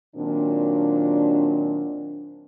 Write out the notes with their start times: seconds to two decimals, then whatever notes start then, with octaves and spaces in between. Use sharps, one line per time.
0.16 A#2 D#3 F#3 C4 D4